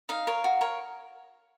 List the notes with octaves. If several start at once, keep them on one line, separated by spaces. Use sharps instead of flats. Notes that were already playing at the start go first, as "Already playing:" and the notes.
D#4 F5
A#4 C#5
F#4
A#4 C#5